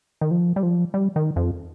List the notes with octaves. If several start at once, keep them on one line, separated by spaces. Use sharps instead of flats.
D#3
F3
G3
F3
G3
D#3
F2